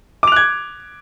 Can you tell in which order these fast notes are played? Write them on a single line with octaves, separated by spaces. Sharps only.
D6 F7 F#6 G#6